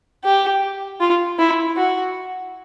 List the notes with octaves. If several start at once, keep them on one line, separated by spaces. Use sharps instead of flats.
G4
F4
E4
F#4